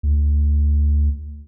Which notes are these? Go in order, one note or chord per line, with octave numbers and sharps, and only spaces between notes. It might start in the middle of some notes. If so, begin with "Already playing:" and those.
D2